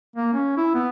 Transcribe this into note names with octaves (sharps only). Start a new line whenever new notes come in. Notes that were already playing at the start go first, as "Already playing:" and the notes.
A#3
C#4
E4
B3